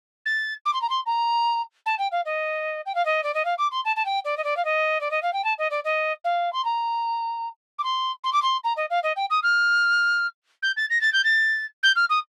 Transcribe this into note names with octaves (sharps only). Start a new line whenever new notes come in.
A6
D6
C6
A#5
C6
A#5
A5
G5
F5
D#5
G5
F5
D#5
D5
D#5
F5
D6
C6
A5
A5
G5
D5
D#5
D5
F5
D#5
D5
D#5
F5
G5
A5
D#5
D5
D#5
F5
C6
A#5
D6
C6
C6
D6
C6
A#5
D#5
F5
D#5
G5
D#6
F6
G6
A6
A#6
A6
G6
A6
G6
F6
D#6